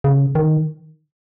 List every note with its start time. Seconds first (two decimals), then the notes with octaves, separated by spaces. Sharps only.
0.04 C#3
0.35 D#3